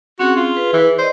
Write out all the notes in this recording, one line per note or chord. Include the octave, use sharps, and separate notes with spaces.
C4 C#4 F#4 G#4
F4
G#4 B4
E3
C5 D5 D#5